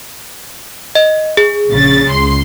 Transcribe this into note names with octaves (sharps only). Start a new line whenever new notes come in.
D#5
G#4
A#1 C#3 A6
C#2 C6